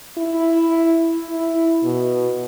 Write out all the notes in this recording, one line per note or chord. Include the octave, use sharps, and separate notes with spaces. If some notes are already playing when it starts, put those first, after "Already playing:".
E4
E4
B2